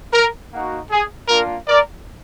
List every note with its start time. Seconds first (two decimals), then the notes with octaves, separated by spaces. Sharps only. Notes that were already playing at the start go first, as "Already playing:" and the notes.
0.13 A#4
0.52 A#3 D#4 F#4
0.91 G#4
1.29 A#3 D4 F4 A#4
1.68 A#4 D5